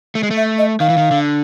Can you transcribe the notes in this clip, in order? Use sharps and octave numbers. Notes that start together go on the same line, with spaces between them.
A3
G#3
A3
E5
D#5
D#3 F5
E3
D#3
D3